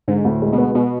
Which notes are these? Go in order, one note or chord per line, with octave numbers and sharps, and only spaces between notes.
G#2 D3
D2 A2
G#3
B2
B3
B2